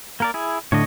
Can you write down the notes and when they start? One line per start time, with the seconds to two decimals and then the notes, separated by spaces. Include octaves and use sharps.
0.20 A#3 A#4 D5
0.34 E4 G#4
0.72 A2 D3 C#5 D#5